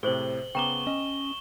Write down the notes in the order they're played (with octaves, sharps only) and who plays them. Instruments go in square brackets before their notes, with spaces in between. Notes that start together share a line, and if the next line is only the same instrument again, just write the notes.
[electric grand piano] A2 C3 [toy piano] G#4 C5 [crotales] F#7 G7
[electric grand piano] C#3 B3 [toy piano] G5 A#5 D6 [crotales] C#6 E7 G7
[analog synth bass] C#4 [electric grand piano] D#5